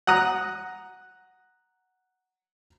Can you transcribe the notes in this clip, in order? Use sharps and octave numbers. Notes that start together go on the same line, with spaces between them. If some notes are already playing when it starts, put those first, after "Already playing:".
F#5 A#5 D#6 F#6